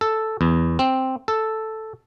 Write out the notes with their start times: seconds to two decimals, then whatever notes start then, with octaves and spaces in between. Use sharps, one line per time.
0.01 A4
0.41 E2
0.79 C4
1.28 A4